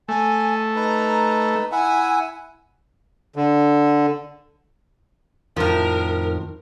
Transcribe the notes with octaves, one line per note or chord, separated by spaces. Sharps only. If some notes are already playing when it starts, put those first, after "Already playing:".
A3 G#5
D#4 B4 A#5
E4 E5 F#5 G#5
D3
F2 A2 D#3 F3 A#4